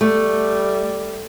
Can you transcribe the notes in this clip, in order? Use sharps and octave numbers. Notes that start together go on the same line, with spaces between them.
G3 A3